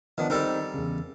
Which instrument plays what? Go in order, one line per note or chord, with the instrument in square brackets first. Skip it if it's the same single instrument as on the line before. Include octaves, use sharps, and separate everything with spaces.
[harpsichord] D#3 [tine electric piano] F3 B3 D4
[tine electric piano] D#3 C4 D#4 [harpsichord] G3 A4 A#4
[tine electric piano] E2 C#3